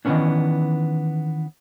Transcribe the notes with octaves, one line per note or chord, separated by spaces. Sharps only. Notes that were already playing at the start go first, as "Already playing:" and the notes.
D#3 E3 F#3 B3 C#4 D4